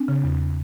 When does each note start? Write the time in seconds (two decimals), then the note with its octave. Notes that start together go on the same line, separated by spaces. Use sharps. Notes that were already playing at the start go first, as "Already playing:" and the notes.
Already playing: C4 D4
0.08 C#3
0.24 E2